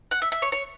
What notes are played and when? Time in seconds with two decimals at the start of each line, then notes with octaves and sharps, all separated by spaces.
0.11 F#5
0.22 E5
0.32 E5
0.42 C#5
0.52 C#5